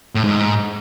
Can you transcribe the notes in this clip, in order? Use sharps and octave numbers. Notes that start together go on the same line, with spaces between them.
A2
G#2